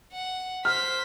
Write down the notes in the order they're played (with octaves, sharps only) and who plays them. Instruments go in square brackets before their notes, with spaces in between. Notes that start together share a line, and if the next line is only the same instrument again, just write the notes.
[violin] F#5
[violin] C5 B6 [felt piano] F6